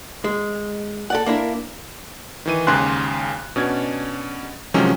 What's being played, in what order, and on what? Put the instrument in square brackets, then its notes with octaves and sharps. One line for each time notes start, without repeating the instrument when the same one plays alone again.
[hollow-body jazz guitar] G#3
A4 D5 F#5
A#3 D4 E4 A#4
[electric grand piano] D#3 E3 D#7
D#2 G#2 C#3 G#5 C6 F#6
B2 C#4 D4 G#6
C3 D#3 F3 F#3 G#3 C#4